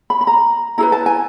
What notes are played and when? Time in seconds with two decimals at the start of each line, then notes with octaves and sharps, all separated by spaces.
0.10 B5
0.21 B5
0.27 A#5
0.78 E4 G#4 B4 A#5
0.92 A5
1.06 G#5